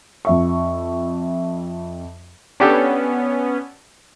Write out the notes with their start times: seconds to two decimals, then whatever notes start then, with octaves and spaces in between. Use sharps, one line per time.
0.25 F2 E5 C#6
2.60 B3 C#4 D4 G4 A4